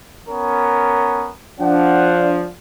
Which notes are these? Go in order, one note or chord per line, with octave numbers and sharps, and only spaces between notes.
B3 C#4 A#4
F3 D4 F#5